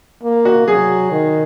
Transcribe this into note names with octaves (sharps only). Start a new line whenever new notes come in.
A#3
F#4
F#3 G#4
D#3